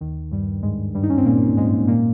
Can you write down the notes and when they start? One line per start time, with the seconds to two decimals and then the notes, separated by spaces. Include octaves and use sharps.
0.01 D#2 D#3
0.31 G2 G3
0.63 G#2 G#3
0.95 G2 G3
1.03 D#4
1.10 C#4
1.18 C4
1.25 A#2 A#3
1.57 G#2 G#3
1.88 A#2 A#3